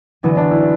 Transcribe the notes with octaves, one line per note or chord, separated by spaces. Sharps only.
D3 E3 F#3 B3 F#4
D4
E4